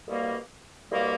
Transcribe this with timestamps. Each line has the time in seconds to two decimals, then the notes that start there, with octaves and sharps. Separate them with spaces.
0.08 C2 B2 G3 A#3
0.90 C2 B2 G3 A#3